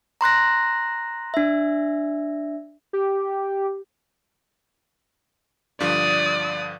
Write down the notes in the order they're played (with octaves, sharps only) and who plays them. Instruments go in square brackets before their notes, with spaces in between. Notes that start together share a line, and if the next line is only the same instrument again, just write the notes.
[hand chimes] A#5 C6 F#6 A#6
D4 E5
[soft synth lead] G4
[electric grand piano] G2 D3 F3 [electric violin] D5 D#6